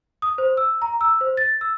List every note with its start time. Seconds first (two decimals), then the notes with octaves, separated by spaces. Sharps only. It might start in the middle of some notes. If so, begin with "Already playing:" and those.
0.22 D#6
0.38 C5
0.57 E6
0.82 A#5
1.01 E6
1.21 C5
1.37 A6
1.61 E6